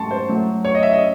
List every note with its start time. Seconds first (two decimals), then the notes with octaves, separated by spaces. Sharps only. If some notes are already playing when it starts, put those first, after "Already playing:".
Already playing: G#2 F#3 A3 A5 C6 C#6
0.11 C5
0.29 A2 F#3 A3
0.65 C#5
0.75 D#5
0.83 E5
0.93 D#5